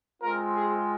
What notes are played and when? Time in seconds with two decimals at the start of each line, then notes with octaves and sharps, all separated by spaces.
0.22 G#3 C4 F4 A#4
0.53 G#4